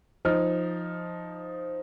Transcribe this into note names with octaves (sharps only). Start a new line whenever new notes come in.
F3 D#4 F6